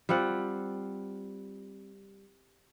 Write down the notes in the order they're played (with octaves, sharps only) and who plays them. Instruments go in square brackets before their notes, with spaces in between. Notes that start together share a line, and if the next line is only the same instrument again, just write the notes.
[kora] G3 C4 F4 F#5